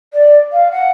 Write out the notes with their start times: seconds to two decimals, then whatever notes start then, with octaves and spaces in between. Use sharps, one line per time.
0.13 D5
0.52 F5
0.71 F#5